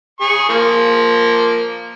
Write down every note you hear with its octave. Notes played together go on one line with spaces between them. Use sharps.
G#4 C#6
F3 A#3